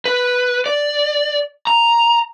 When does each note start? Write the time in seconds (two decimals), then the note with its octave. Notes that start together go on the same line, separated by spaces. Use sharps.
0.05 B4
0.66 D5
1.67 A#5